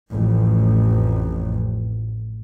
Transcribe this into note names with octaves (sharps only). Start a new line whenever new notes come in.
A1 F2